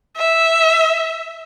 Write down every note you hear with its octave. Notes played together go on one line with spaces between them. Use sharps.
E5